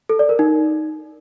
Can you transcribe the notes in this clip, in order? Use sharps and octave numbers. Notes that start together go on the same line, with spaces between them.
A4
D5
A#4
D#4